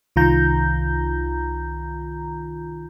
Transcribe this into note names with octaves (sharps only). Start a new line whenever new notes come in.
C2 D#3 F4 A#5 G6